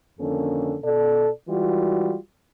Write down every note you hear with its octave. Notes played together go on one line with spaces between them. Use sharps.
F2 D3 D#3 A#3 C#4 A4
B2 A4 D5
E3 G3 G#3 F4 F#4